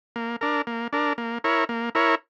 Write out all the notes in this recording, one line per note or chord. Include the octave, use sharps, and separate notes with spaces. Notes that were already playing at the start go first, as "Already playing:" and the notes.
A#3
D4 A#4
A#3
D4 A#4
A#3
E4 A#4 C#5
A#3
E4 A#4 C#5